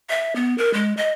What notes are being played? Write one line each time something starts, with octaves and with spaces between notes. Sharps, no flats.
E5
B3
A#4
G#3
D#5